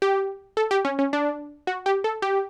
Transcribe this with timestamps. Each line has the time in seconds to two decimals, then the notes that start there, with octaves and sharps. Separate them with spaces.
0.02 G4
0.57 A4
0.71 G4
0.85 C#4
0.99 C#4
1.13 D4
1.67 F#4
1.86 G4
2.04 A4
2.22 G4